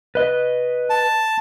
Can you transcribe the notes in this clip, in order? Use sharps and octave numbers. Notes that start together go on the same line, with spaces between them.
B4 D#5
A5